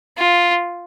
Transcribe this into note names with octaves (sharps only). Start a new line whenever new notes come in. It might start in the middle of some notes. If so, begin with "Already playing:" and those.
F4